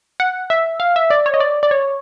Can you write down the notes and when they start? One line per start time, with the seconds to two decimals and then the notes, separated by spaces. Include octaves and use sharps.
0.20 F#5
0.50 E5
0.80 F5
0.96 E5
1.10 D5
1.26 C#5
1.34 D#5
1.40 D5
1.63 D5
1.71 C#5